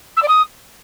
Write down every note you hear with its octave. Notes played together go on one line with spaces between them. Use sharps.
E6
D5
D#6